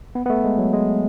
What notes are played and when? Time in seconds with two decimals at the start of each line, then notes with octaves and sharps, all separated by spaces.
0.15 B3
0.26 B3
0.30 A3
0.44 G#3
0.58 F#3
0.73 G#3